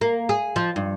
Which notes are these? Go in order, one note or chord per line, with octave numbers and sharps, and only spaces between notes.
A#3
G#4
F3
G2